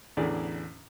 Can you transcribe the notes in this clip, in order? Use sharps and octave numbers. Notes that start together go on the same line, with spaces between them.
A1 E2 A2 D3 G#4 D5